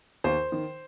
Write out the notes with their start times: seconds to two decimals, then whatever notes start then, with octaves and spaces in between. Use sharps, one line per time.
0.24 D#2 C5
0.52 D#3